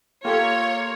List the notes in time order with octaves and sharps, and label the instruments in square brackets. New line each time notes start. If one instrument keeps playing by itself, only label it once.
[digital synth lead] A#3 [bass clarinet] F4 [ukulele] G4 A4 G5 [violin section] C#5